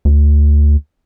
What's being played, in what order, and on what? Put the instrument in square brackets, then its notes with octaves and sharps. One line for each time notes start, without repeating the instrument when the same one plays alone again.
[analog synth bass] D2